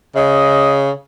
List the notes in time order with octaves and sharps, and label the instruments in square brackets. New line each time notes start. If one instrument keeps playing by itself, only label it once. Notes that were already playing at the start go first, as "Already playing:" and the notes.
[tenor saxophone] C#3 [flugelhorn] D#5